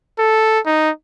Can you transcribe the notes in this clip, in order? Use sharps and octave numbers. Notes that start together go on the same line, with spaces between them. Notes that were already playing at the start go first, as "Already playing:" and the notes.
A4
D#4